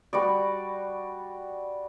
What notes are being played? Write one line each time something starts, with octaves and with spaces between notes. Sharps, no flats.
G3 F#4 D5